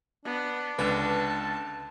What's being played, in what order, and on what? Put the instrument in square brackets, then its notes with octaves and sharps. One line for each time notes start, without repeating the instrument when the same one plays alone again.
[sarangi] B3 [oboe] D4
[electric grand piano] C#2 D3 [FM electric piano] B4 [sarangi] A5